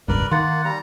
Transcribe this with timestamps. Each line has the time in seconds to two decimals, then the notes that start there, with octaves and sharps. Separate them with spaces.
0.08 F1 C#2 G2 A#4 B4 D5
0.31 D#3 A#3 F#5 C6 A6
0.65 G3 A#5